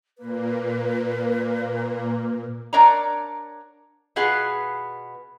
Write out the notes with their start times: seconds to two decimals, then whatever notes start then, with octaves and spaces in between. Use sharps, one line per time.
0.18 A#2 A#3 B4
2.73 D4 A#4 C#5 D5 F#5 A#5
4.16 B2 B3 F4 G#4 B4 F#5